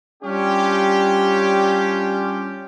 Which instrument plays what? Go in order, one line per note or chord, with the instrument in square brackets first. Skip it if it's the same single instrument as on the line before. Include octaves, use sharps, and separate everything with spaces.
[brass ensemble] G3 C#4 D4 F4 G4